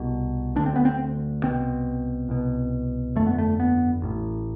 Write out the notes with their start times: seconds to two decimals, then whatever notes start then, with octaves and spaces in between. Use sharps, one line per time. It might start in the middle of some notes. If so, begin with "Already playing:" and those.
Already playing: C2 B2
0.56 D2 D3 D4
0.66 C4
0.76 B3
0.85 C4
1.42 C2 B2 C4
2.29 C2 B2
3.16 G1 F2 D3 A3
3.26 B3
3.38 A3
3.60 B3
4.02 A1 A2